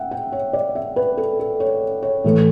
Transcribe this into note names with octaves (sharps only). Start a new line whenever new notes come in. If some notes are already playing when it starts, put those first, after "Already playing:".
Already playing: E5 F#5 G5
G5
C#5
D5
E5
B4
A4
A4
C#5
C#5
A2 E3 A3